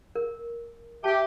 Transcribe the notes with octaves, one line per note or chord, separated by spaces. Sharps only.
A#4
G4 E5 A5